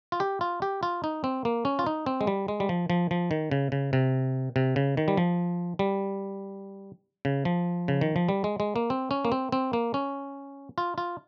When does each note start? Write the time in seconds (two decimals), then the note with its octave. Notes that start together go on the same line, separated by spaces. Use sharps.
0.12 F4
0.20 G4
0.41 F4
0.62 G4
0.83 F4
1.04 D#4
1.24 C4
1.45 A#3
1.65 C#4
1.79 F4
1.86 D#4
2.06 C4
2.21 G#3
2.27 G3
2.48 G#3
2.60 G3
2.69 F3
2.90 F3
3.11 F3
3.31 D#3
3.51 C#3
3.72 C#3
3.93 C3
4.56 C3
4.76 C#3
4.97 D#3
5.08 G3
5.17 F3
5.79 G3
7.25 C#3
7.45 F3
7.88 C#3
8.01 D#3
8.16 F3
8.29 G3
8.44 G#3
8.60 G#3
8.76 A#3
8.90 C4
9.11 C#4
9.25 A#3
9.32 C4
9.52 C4
9.73 A#3
9.94 C#4
10.78 F4
10.98 F4